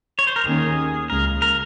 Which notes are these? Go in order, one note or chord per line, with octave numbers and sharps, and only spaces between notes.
C#5
C5
A#4
D#2 D#3 A#3 C#4 G#4
C#2 C#3 G#3 A#4
A#4